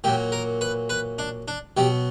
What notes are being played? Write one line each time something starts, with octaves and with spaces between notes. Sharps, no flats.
A#2 F#3 G4
A#4
B4
B4
D4
D4
B2 F#3 G4